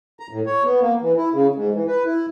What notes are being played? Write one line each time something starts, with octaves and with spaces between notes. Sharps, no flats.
A#5
A2
C#5
B3
A#3
E3
E4
C#3
G#2
E3
B4
E4